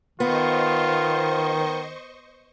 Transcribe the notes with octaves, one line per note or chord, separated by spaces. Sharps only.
D#3 B3 F4 C5 D#5 C#6